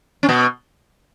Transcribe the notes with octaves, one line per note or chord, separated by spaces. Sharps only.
C#4
B2 B3